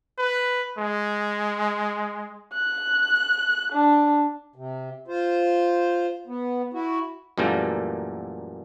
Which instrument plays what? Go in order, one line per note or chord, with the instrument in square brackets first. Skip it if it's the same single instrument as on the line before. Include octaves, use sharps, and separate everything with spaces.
[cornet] B4
G#3
[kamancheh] F#6
D4
[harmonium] C3
F4 C5
B3
E4 F#4
[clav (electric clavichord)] F#2 A#2 E3 G3 A3 A#3